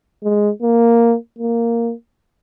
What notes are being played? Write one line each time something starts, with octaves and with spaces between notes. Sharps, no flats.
G#3
A#3
A#3